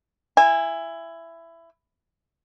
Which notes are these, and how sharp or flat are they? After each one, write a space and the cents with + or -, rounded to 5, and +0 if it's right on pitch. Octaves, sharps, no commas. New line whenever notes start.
E4 +15 G#5 -20